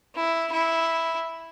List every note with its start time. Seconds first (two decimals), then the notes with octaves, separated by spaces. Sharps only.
0.16 E4
0.52 E4